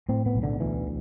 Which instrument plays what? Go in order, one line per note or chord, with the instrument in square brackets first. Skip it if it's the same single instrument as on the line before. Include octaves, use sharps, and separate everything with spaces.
[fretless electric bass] A2 C4
B3
B1
D3
D2 E3